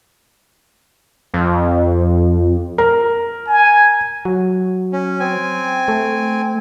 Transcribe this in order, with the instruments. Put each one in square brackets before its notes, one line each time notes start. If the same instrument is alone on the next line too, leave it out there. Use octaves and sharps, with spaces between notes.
[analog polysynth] F2
[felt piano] A#4
[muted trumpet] G#5
[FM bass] F#3
[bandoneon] C#4
C4 G#5
[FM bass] A3